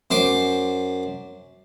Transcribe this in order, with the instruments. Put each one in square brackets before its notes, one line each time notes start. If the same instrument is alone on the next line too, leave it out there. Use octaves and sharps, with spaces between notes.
[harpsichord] F#2 C5 C6 D6